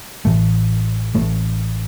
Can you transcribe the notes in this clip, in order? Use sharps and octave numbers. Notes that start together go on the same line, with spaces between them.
A1 A2 E3 A3
A1 A2 A3